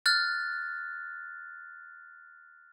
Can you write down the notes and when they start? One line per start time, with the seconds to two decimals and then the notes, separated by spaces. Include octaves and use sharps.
0.06 F6 F#6 A6